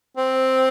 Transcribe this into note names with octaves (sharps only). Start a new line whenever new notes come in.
C4